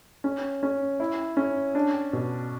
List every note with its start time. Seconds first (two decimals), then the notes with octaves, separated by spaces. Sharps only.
0.24 C#4
0.63 C#4
1.00 E4
1.37 C#4
1.75 D4
2.13 B2